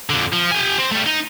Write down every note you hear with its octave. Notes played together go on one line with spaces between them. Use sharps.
F2 D3
F3
G4 G#5
C4
G3 A3
D#4